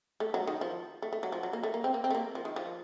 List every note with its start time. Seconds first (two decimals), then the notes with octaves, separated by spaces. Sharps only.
0.20 A3
0.34 F#3
0.47 D#3
0.61 F3
1.02 A3
1.13 A3
1.23 F#3
1.32 F3
1.43 F#3
1.53 A#3
1.63 A3
1.74 A#3
1.84 C4
1.94 A#3
2.04 C4
2.10 A3
2.15 A#3
2.35 F3
2.45 D#3
2.56 F3